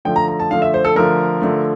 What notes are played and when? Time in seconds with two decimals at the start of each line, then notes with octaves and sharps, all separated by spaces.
0.05 D3 F3 A3 G5
0.16 A#5
0.28 A#5
0.39 A5
0.50 D3 F3 A3 F5
0.62 E5
0.74 C5
0.85 A4
0.95 D3 F3 A3 A#4
1.42 D3 F3 A3